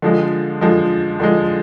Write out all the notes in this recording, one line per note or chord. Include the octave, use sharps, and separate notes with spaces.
D3 F3 G#3
D3 F3 G#3
D3 F3 G#3